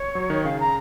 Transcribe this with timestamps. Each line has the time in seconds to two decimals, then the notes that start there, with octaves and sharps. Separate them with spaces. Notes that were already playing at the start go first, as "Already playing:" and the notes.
Already playing: C#5
0.15 F#3
0.30 D#3
0.44 C#3 F5
0.60 A#5